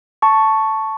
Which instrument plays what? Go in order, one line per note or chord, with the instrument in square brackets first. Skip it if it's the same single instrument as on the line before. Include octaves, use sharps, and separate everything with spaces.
[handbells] A5 C#6